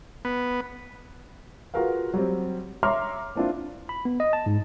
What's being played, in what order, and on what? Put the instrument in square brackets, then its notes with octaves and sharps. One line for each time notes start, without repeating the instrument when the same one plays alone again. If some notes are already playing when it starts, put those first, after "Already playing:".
[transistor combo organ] B3
[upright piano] F4 F#4 G#4 A#4 B4 F5
F#3 G3 C4
C#5 E5 A#5 C6 D6 F6
A#3 C4 D4 E4 F4
[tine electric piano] B5
B3
D#5
A5
G#2